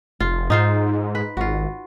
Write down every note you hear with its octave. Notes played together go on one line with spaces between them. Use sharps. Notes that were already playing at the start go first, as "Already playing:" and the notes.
F1 F4
G#2 D#4 F4 C5
B4
G#1 F4 F#4